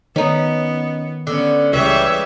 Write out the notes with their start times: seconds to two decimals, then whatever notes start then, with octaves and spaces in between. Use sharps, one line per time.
0.16 D#3 B3 C#4 D#4
1.27 D3 B3 C#4
1.73 C#2 E3 G3 G#3 E4 C#5 E5